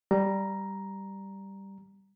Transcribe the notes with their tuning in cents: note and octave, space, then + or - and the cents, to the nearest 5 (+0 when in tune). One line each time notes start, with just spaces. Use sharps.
G3 +0 A#5 +5